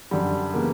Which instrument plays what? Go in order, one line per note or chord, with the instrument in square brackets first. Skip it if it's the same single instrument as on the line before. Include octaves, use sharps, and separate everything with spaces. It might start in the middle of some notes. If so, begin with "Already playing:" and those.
[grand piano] F#2 D3 F#3 [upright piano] G3
[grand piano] C#3 E3 B3 [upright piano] A#3